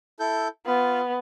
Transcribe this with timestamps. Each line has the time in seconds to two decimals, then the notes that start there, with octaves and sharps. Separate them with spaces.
0.20 E4 A4 G6
0.66 B3 F4